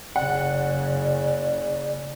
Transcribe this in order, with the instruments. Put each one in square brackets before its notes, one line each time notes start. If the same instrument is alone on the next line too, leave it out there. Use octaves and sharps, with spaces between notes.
[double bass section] F#1 C#3 [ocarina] D5 [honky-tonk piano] F#5